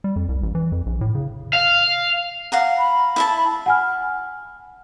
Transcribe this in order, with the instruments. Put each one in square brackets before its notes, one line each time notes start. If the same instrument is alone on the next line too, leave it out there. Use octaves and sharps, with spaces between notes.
[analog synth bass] G3
F2
C2
A1
E3
F2
A#1
A2
C#3
[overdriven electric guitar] F5
[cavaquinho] F5 F#5 A#5
[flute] B5
[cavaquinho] E4 E5 A5
[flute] B5
[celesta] F#5 G#5 F6